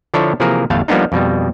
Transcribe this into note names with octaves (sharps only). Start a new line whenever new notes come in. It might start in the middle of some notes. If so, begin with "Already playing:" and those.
D3 F3 D4 E4 A4 C#5
C3 E3 F3 A#3 G#4 A#4
G1 E2 A2 A3 F5 A5
F3 G3 A#3 B3 D4 D#4
F2 B2 G3